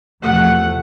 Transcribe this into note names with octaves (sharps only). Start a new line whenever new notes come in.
E2 C3 F3 A3 F#5